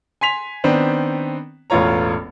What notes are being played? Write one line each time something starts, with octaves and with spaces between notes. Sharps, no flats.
G#5 C6 B6 F7
D#3 B3 C4 D4
E1 A1 A3 F4 C#5 A#5